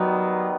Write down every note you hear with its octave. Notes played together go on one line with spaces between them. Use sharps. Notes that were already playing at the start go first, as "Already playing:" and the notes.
Already playing: D#3 F#3 G3 B3